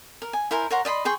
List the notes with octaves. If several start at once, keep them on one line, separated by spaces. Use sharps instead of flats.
A#4
G#5
E4 A#4 C5 G#5
A#4 C#5 F#5 C6
D5 D#5 B5 C6
G#4 G5 C6 C#6